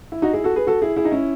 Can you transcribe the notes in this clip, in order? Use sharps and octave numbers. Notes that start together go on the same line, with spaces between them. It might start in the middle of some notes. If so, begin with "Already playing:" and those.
E4
D#4 F#4
E4 G#4
F#4 A4
G#4 B4
F#4 A4
E4 G#4
E4 G#4
D#4
C#4 E4